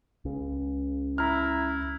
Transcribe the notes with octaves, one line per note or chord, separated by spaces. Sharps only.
C#2 C#3
E4 A#5 F6